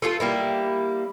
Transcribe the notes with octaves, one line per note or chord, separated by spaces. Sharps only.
A3 F4 G4 A4
G3 A#3 E4